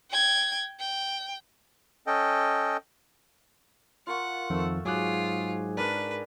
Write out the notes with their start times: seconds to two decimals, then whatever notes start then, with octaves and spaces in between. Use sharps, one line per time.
0.11 G5 G#6
0.79 G5
2.07 C#4 A4 D#5 G5
4.07 F4 A#4 F#5 C#6
4.50 F2 D#3 F3 A3 E6
4.85 G#2 F#3 F4 F#4 G#4 D6 F#6
5.77 D4 A#4 B4 D5